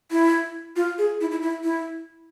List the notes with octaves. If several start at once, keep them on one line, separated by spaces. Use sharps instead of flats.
E4
F4
G#4
E4
E4
E4
E4